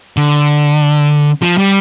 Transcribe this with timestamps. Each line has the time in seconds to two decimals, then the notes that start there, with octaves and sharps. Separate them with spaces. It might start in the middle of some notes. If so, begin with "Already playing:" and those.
0.17 D3
1.42 F3
1.58 G3